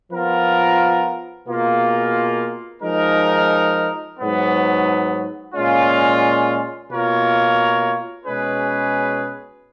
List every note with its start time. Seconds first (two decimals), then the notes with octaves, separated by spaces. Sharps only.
0.11 F3 B3 F4 A#4
1.47 B2 A#3 F4 G#4
2.83 F3 G#3 D#4 A#4
4.18 G#2 F#3 B3
5.54 A#2 G#3 C#4 F4
6.90 B2 A#3 F4 A#4 C#5
8.26 B2 G#3 C#4 G#4 B4